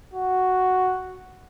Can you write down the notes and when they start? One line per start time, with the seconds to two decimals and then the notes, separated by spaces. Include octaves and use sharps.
0.13 F#4